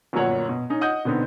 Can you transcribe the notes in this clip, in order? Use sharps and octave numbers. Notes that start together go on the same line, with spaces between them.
G1 F#2 A#2 F#3 C#5 F#5
B2
C#4 D#4
D#5 F#5 D#6 G6
B2 D3 B3 C4 D#4